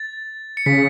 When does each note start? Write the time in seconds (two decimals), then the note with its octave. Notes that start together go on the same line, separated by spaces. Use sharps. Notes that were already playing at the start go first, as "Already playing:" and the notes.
Already playing: A6
0.57 C#7
0.66 C#3 B6